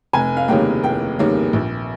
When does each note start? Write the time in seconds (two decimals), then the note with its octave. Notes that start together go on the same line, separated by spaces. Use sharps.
0.13 F1 G#5
0.37 F5
0.48 D#2 C#3 G3 A#3 G5
0.83 F1 G5
1.19 D#2 C#3 G3 A#3
1.53 A#1